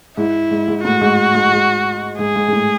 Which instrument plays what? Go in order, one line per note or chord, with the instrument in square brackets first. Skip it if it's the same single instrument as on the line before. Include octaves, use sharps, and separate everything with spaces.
[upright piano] G#2 [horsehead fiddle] E4
[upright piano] G#2
G#2
[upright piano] A2 [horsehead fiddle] F#4
[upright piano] G#2
G#2
G#2
[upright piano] G#2 [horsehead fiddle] G#4
[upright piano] G#2
G#2
A2